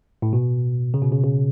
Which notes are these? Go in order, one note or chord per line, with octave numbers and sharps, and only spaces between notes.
A2
B2
C#3
B2
C#3
C#3